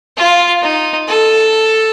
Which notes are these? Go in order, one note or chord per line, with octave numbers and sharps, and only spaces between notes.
F4
D#4
A4